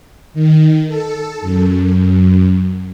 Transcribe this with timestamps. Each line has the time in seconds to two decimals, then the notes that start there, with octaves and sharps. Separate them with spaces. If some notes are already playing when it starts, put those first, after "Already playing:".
0.34 D#3
0.87 A4
1.41 F#2